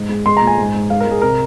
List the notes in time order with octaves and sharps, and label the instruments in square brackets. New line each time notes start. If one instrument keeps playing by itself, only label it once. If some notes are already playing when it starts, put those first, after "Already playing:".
Already playing: [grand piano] G#2
G#3
G#3 C6
A#2 A#5
G#5
G#2
G#2
G#3 F5
A#4
G#3 G#4
C3 A#4